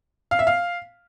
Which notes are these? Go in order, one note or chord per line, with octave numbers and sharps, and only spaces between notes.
F5
E5
F5